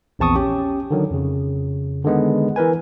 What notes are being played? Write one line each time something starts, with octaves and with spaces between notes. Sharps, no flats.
A#1 E2 C4 A5 C#6 D#6
C#4 G4
D3 D#3 F#3
F2 C#3
D3 D#3 G#3 B3
E3 A#4 B4 G#5